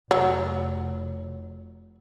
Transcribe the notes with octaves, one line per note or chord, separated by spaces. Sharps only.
F1 F#3